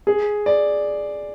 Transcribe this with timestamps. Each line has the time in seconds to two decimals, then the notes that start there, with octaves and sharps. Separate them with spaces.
0.07 G#4
0.46 D5